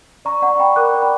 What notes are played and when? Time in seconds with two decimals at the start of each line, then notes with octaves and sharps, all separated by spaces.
0.25 D5 A#5 C#6
0.42 D5 F#5 A#5
0.55 C#6
0.59 D5 G5 B5
0.76 A#4 D6 F#6
0.94 D5
1.02 G5 B5